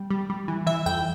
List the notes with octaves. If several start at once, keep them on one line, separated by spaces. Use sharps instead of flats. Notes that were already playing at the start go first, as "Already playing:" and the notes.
Already playing: G3
G3
G3
E3
E3 E5
F2 G5